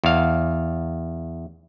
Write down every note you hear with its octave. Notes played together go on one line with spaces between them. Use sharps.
E2 F5